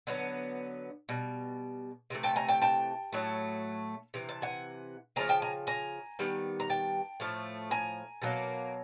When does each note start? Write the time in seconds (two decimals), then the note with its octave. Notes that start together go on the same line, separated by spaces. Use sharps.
0.07 D3 F#3 B3
1.09 B2 G3
2.10 C3 E3 A3
2.23 G5 A5
2.36 G#5 A#5
2.48 G5 A5
2.61 G5 A5
3.13 A2 F#3 A3
4.14 C3 E3
4.29 A5
4.42 F#5 G#5
5.16 C#3 F3 A3 G#5 A#5
5.29 G5 A5
5.42 G#5 A#5
5.67 G#5 A#5
6.19 D#3 G3 B3
6.60 A#5
6.70 G5 A5
7.20 A2 F3 A3
7.71 G#5 A#5
8.22 B2 F#3 A#3